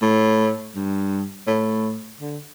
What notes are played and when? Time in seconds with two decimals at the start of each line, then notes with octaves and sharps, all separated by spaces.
0.02 A2
0.75 G2
1.47 A2
2.20 D3